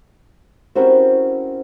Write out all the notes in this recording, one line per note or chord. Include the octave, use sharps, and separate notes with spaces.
C4 C#4 E4 F#4 G4 A#4